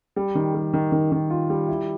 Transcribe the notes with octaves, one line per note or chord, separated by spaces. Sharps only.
G3
D#3
G3
D#3
D#3
D#3
F4
G3
E4